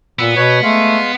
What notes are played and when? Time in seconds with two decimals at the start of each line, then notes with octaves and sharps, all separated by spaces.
0.19 A#2 B3 E6
0.36 B2 B4 C#5
0.63 G#3 A3 F5